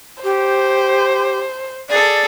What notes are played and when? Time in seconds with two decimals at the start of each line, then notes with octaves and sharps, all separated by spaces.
0.24 G4 C5
1.89 G#4 A4 D5